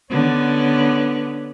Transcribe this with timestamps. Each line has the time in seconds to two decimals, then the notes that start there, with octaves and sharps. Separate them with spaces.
0.10 D3 B3 C#4